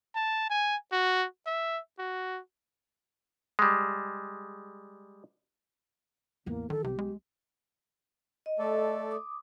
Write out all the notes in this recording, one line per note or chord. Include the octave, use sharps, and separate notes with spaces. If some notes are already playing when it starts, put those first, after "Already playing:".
A5
G#5
F#4
E5
F#4
G3 G#3
A1 E2 A#3
D#3 E3 A4
B1 C3 G3 G4
G#3
D#5
A3 A4 D5
D6 D#6